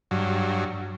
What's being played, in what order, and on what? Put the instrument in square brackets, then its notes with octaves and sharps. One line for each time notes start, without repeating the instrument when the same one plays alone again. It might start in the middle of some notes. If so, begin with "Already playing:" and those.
[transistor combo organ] G2 F#3